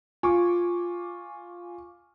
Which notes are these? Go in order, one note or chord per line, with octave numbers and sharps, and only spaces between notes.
F4 G#5 C#6 D6